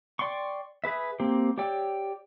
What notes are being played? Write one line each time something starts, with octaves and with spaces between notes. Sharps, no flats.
D5 G5 C6 C#6
G#4 B4 E5
A#3 C4 G4
G4 C#5 D5 G5 E6